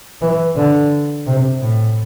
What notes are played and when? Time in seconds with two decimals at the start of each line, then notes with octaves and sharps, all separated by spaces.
0.22 E3
0.56 D3
1.27 C3
1.62 A2